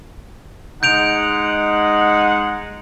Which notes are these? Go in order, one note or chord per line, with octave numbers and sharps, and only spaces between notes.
G#3 D#4 F#5 G6 D7 F7